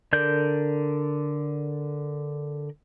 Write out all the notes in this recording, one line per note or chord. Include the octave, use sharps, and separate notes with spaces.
D3 A#4 D5 G6